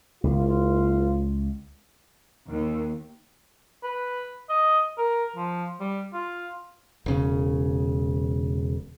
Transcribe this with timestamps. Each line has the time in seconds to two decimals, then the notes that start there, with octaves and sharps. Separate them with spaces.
0.24 F#1 C#2 F4
2.49 D#2
3.83 B4
4.49 D#5
4.98 A#4
5.36 F3
5.80 G3
6.13 F4
7.06 E1 C#3